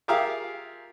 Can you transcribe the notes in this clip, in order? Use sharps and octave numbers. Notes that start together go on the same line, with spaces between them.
F4 G4 G#4 A#4 E5 F5